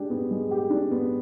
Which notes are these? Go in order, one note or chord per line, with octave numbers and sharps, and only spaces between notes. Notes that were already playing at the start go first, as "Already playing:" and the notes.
Already playing: G#3 D4 G4
B3
G#3
G4
D4
B3